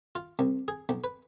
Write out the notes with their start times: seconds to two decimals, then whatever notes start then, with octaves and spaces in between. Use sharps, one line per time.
0.15 F4
0.39 C2
0.68 G#4
0.89 B1
1.04 B4